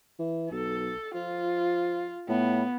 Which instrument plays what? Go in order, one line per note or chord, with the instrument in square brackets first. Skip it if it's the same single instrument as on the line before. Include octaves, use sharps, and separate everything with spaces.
[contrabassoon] E3
[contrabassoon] B1 [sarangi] A4
[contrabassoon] F3 [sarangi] F4
[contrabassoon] A2 [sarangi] B3